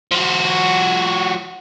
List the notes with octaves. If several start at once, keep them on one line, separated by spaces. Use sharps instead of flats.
F3 F#4